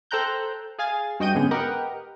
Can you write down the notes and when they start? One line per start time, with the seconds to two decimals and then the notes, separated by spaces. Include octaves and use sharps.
0.11 A4 C5 G5 A#5 F#6 G6
0.79 G#4 F5 G#5 A6
1.20 G2 F#4 D#5 G5 G6 D#7
1.35 G#2 D3 B3 C#4 G#4
1.51 G4 A#4 B4 D#5 F#5 G5